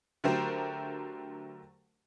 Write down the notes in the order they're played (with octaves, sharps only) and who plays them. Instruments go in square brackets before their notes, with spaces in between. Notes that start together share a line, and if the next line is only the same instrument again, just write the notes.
[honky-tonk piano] D3 F#3 A3 G4 A#4 C5